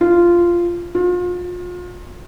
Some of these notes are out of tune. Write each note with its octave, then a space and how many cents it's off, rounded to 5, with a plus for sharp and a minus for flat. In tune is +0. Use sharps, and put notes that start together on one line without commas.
F4 -10
F4 +35